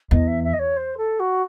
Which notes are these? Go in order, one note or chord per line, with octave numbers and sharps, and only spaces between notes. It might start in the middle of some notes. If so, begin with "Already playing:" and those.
E2 D#5
E5
E5
D#5
C#5
C5
A4
F#4